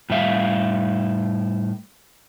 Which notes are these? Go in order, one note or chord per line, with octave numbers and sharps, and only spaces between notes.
A2 G3 E5 F5